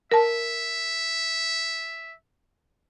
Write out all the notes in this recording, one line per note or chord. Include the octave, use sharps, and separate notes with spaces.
A#4 E5 A5